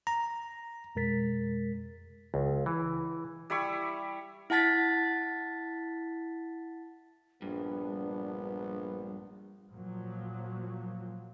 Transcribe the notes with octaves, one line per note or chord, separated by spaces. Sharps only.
A#5
F2 B2 G#3 A#4 A6 B6
C#2
E3
G3 E4 B5 C#6
E4 F#5 A5 A6 B6
A#1 G2 B3 D4
A#2 F3 F#3